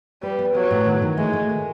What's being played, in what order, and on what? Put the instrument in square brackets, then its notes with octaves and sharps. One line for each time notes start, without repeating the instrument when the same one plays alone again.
[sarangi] G3 [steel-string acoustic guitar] B4
[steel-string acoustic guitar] B3
[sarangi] F#3 [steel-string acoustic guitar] B3
[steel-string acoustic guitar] A2
D#3
D#3
[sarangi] G#3 [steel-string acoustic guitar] A3
[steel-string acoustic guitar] A3
A#4